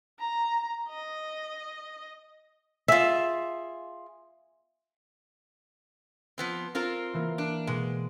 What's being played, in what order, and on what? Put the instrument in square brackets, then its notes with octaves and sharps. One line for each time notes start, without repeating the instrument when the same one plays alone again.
[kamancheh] A#5
D#5
[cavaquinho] F4 G#4 [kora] E5
[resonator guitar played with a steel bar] F3 B3 C4
C4 F4 A#4
[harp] E3 A#3
[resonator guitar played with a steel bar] D4
[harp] B2 [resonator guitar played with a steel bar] G#3